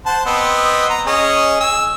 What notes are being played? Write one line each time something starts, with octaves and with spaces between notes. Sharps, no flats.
C5 F#5 A5
B3 C4 D#5
A#5
C#4 G#4 D#5
G#5 E6